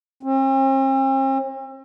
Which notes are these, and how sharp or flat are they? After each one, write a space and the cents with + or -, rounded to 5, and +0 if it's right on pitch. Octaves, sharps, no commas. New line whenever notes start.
C4 +45